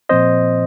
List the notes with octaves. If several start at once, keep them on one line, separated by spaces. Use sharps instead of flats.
A#2 F3 C4 C5 D#5